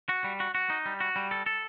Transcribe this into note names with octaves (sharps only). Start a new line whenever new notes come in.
F#4
G3
F#4
F#4
D#4
G3
F#4
G3
A4
A4